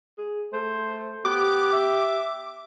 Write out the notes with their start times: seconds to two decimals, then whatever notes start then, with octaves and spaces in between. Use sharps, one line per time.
0.18 G#4
0.53 A3 C5
1.25 B3 G4 D6
1.72 E5